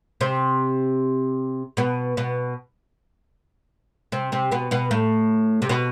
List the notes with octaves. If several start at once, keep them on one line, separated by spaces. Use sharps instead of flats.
C3 C4
B2 B3
B2 B3
C3 C4
C3 C4
B2 B3
B2 B3
A2 A3
C3
B2